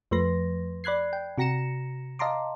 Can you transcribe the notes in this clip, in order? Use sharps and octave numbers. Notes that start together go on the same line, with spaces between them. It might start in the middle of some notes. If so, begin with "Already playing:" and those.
F2 F3 A3 B4 C6 A#6
D5 B5 F#6 G#6 C7
G5
C3 F#4 A#5 A#6 C#7 E7
D#5 F5 A5 A#5 C6 D6